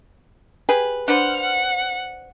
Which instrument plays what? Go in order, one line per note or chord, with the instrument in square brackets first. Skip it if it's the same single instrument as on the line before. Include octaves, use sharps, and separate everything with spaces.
[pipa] G4 G#4 B4
[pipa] D4 B4 C5 [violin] F#5 F6
[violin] F#5